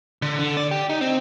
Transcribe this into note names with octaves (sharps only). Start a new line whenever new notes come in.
D3
D3
D5
G4
D#4
C4